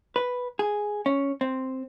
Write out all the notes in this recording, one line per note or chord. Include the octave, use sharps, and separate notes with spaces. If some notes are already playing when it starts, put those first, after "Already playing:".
B4
G#4
C#4
C4